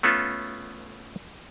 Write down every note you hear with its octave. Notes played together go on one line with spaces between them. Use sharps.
A3 B3 C#4 F4 A4